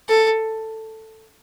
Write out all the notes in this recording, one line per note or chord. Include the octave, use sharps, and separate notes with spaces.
A4